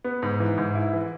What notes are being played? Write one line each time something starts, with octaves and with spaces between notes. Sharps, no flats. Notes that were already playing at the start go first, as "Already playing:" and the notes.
B3
G#2
E3
G#2
E4
E3